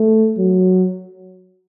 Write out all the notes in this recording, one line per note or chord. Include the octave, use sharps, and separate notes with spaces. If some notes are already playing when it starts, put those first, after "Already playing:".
Already playing: A3
F#3